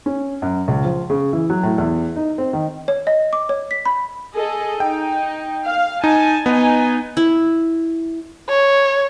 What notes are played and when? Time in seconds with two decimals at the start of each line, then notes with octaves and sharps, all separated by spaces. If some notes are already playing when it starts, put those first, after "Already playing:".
0.06 C#4
0.42 F#2
0.68 C#2
0.85 F3
1.10 C#3
1.33 E3
1.50 F#3
1.63 A2
1.78 E2
2.16 D#4
2.38 C4
2.53 D#3
2.88 C#5
3.07 D#5
3.33 D6
3.49 C#5
3.71 B6
3.86 B5
4.34 G#4 A4 D#5
4.80 D#4 G5
5.65 F5
6.04 D#4 G#5 A5
6.46 B3 D#4 G#5
7.17 E4
8.49 C#5